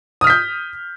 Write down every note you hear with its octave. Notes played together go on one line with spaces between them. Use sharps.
D#6 F6 G6 B6